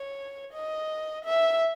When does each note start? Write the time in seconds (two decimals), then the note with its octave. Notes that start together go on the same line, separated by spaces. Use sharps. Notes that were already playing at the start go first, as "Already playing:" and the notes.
Already playing: C#5
0.53 D#5
1.25 E5